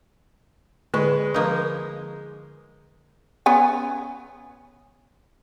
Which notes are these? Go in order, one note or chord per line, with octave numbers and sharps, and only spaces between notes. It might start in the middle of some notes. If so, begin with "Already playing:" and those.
D3 G#3 B4 C#6
F3 A#3 D#4
B3 C#4 G#5